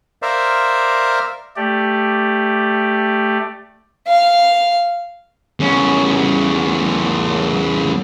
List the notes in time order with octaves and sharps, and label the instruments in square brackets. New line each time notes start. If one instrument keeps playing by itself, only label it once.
[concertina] A#4 C5 D5 E5 F5
[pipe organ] A3 G4 D5
[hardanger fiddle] F5
[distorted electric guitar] E2 C#4